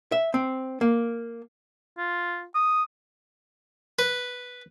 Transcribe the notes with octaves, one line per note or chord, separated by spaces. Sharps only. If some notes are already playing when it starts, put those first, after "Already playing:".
E5
C4
A#3
F4
D#6
B4